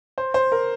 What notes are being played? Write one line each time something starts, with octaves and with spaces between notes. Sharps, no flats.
C5
C5
A#4